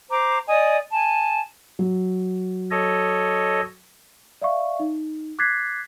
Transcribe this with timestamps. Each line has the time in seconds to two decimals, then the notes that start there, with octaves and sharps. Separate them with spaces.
0.10 C5 A#5 D6
0.48 D5 D#5 G#5 D#6
0.92 G#5 A5
1.79 F#3
2.71 A4 C#5 D#5
4.42 D5 E5 F5 C#6
4.79 D#4
5.39 D6 F#6 G#6 A6 B6 C7